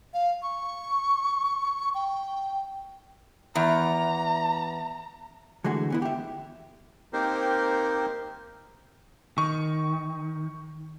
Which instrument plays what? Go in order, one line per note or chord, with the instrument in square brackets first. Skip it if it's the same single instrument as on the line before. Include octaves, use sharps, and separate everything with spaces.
[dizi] F5
C#6
G5
[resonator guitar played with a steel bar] E2 [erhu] A#5
[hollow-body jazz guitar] D3 E3 G#3 A3 F#4
E3 B3 E4
G4 E5
[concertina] A#3 C4 D#4 G4 A#4 C5
[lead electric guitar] D#3 [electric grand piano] C#6